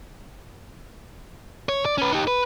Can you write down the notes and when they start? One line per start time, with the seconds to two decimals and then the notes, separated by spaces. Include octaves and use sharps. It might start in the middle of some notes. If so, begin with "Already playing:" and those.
1.69 C#5
1.85 D5
1.98 C#4 B4
2.13 D#4 G4
2.27 B4